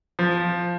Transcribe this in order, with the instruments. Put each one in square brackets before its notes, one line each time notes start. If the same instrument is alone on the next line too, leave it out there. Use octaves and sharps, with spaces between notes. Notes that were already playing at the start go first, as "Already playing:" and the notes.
[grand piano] F3